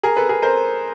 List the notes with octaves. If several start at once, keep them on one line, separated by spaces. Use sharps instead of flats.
G#4 A#4
A4 B4
G#4 A#4
A#4 C5